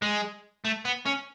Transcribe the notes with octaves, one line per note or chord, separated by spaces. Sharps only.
G#3
A3
B3
C#4